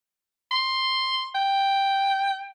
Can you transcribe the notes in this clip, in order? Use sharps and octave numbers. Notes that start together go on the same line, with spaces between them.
C6
G5